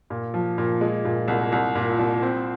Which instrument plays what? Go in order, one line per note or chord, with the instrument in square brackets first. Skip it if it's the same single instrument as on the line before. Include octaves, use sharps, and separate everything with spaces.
[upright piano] A#2
F3
A#2
G#3
A#2
C2
C2
A#2
C2
C4